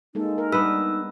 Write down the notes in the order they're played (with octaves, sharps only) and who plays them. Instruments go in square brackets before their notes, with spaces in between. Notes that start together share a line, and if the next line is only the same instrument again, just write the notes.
[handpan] G#3 A#3 A4 [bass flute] D#4
[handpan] A#4
[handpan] G3 D4 [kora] B3 B4 [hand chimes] E6